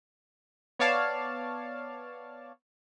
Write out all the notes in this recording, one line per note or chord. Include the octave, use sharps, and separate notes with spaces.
B3 C#5 D5 F5 A5